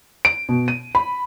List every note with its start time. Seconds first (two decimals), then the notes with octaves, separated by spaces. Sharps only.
0.25 D7
0.49 B2
0.68 D#7
0.95 B5